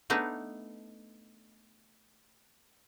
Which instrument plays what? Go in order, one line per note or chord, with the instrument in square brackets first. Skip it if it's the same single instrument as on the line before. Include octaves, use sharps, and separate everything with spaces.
[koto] A3 B3 D4 D#4